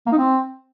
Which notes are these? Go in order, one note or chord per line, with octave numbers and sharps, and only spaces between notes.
A#3
D#4
C4